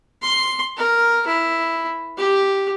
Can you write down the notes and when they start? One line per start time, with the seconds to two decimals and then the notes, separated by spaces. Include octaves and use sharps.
0.22 C6
0.77 A#4
1.27 E4
2.17 G4